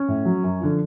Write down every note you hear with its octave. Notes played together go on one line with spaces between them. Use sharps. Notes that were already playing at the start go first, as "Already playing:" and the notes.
Already playing: C#4
A2
F#3
F#2
D3 F3